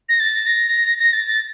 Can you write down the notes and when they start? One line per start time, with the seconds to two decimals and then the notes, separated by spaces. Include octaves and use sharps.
0.09 A#6
0.20 A6
0.46 A#6
0.99 A#6
1.13 A6
1.26 A6